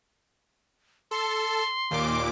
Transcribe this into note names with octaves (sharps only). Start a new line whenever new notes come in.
A4 C6
D#2 A#2 D6